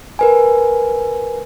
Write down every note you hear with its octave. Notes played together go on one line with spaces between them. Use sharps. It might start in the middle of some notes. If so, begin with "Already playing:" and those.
A#4 B4 G#5